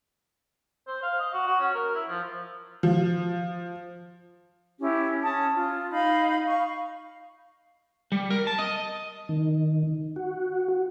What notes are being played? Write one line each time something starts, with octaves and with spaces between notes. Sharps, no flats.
C5
F5
D#5
F#4
F#4
C#4
A#4
E4
F3
F3
C#4 E4 G4
C#4 A5 D#6
F4
D#4 F5 B5
F5 C#6
G3
A#4
A5
D#5
D#3
F#4